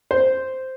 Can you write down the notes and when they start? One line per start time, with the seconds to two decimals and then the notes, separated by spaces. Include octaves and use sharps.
0.11 C5